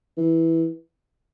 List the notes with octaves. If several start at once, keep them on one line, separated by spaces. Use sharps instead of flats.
E3